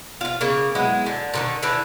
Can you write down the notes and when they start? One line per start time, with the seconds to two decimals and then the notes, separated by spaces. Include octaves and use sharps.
0.21 F4 F5
0.41 C#3 A#3
0.75 F#3 G#3 B3 E4
1.06 D3
1.33 A#2 D3 D#3
1.63 D3 E3